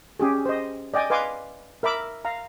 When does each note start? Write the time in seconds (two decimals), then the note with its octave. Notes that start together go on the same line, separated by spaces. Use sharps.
0.20 C#4 G4 G#4
0.46 C5 D#5
0.94 D5 D#5 G5 G#5
1.10 B4 D#5 F5 G#5 C6 D6
1.83 A#4 E5 B5 D6
2.25 F5 A#5